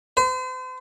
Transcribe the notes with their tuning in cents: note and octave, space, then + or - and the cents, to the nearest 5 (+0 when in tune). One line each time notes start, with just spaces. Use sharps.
C5 -40